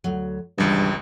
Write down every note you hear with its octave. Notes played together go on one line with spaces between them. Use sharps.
D2 F#3
G#1 C#2 G2 E3 G3 D5